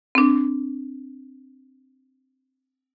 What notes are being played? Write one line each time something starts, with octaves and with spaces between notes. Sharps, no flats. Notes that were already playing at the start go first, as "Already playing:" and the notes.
C4 D4